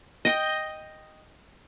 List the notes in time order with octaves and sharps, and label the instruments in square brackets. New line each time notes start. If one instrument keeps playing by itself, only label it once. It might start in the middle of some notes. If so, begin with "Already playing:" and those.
[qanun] D#5 G5